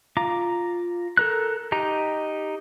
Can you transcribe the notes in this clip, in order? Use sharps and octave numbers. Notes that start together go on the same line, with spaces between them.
F4 A#5 D6
A4 A#4 F#6
D#4 G4 A#5